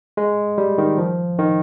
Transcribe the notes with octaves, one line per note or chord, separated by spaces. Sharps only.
G#3
G3
D#3
F3
D#3